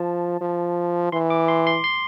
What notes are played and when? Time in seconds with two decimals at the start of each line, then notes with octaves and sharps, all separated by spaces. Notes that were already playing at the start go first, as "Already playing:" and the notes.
Already playing: F3 A5
0.41 F3
1.12 E3 C6
1.30 D6
1.48 C6
1.67 C6
1.84 C6